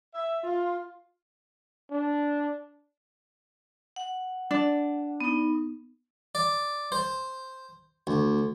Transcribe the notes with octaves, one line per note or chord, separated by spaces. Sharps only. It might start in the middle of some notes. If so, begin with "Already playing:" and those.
E5
F4
D4
F#5
D4
B3 D#4
D5
C5
D2